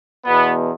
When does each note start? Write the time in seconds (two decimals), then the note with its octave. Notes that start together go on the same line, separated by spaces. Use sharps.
0.25 E2 B2 B3